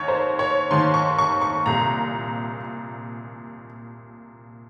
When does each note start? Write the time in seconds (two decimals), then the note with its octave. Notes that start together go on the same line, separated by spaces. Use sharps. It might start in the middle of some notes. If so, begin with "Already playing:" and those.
Already playing: D#2 D#3 C#5
0.08 C5
0.39 C#5
0.71 D#2 D#3 C6
0.94 C#6
1.18 C#6
1.42 C#6
1.66 C2 A#2 A#5